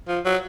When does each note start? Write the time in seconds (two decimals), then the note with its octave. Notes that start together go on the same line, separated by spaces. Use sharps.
0.08 F3
0.25 F#3